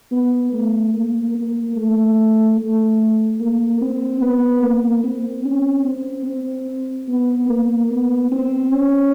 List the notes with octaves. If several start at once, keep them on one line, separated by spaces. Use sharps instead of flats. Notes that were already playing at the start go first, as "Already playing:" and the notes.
B3
A3
A#3
A#3
A3
A3
A#3
C4
B3
A#3
C4
C#4
C4
C4
B3
A#3
B3
C4
C#4